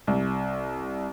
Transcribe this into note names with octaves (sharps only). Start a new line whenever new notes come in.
C2